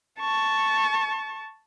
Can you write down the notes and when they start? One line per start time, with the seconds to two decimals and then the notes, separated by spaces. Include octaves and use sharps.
0.20 A5 C#6